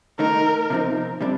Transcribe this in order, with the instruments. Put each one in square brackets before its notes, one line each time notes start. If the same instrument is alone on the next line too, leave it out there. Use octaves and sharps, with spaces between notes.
[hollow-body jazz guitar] D#3 A3 D#4 [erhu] A#4
[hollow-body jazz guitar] C3 F3 C4 D#4
C3 G3 D4